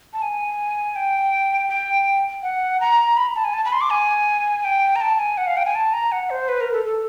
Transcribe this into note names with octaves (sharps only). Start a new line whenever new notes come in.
A5
G#5
G5
G5
F#5
A#5
B5
A5
G#5
A5
B5
C6
D6
G#5
G5
A#5
A5
G#5
F#5
F5
G5
G#5
A5
A#5
F#5
C5
B4
A#4
A4
A4